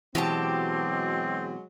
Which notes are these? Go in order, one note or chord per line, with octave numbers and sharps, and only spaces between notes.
B2 E3 F#3 G#3 C4 G4 A5